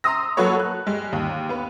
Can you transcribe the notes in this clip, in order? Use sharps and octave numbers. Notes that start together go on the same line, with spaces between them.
A#5 C6 D#6 E6 A#6
F#3 A#3 F#4 A4 B4 C#5
F#6
G3 G#3
D#2
B3 B4